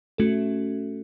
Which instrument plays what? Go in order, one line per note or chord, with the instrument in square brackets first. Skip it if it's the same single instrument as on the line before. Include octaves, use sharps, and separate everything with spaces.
[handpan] A3 [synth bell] C#4 F#4 A4